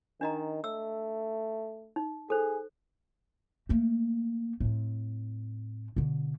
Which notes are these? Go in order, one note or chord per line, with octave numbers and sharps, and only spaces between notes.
D#3 D4 D#5 A#5
A3 E6
D#4
G#4 A4 C5
A3 A#3
A2 C4
B2 D3